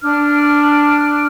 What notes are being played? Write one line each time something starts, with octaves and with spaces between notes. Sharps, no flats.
D4 F6